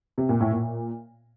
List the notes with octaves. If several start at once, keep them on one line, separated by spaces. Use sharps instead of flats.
C3
A#2
A2
A#2